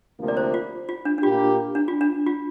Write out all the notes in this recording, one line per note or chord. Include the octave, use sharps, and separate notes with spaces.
D2 C3 F3 A#3
D5
C5
F4
F4
D4
D4
A#2 A#3 F4 G4
D4
F4
D4
F4